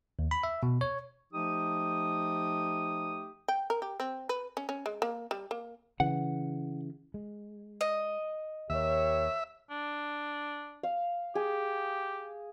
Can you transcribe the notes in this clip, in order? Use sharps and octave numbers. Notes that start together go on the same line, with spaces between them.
D#2
B5
E5
B2
C#5
F3 A3 D#4 G4 D#6
G5
A#4
G4
C4
B4
C#4
C#4
G#3
A#3
G3
A#3
C#3 E3 F#5
G#3
D#5
D#2 G4 A#4 C#5 E5
D4
F5
G4 G#4